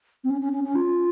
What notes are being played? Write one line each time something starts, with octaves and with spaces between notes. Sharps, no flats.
C4
C#4
C#4
C#4
C#4
F4